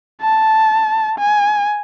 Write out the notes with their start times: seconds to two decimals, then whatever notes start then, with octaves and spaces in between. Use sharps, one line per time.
0.21 A5
1.19 G#5